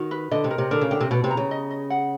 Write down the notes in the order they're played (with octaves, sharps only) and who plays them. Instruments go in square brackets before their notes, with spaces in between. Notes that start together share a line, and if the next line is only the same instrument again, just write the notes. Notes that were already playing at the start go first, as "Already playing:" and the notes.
Already playing: [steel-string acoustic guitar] D#3 [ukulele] F#4
[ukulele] B4
[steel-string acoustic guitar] D3 [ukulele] D#5
[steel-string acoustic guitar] C3
[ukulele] A#4
[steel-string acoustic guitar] C3
[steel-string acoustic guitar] D3 [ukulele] A#4
[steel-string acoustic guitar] C#3
[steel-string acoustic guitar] D3 [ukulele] G5
[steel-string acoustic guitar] C3
[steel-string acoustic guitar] B2 [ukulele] B4
[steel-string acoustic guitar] C3
[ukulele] A#5
[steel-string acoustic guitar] C#3
[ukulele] D#5
D#5
F#5